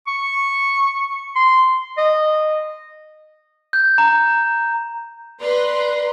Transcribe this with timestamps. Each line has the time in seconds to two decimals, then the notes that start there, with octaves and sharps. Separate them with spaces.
0.08 C#6
1.36 C6
1.98 D#5
3.73 G6
3.98 A#5
5.40 B4 D5 A#5 C6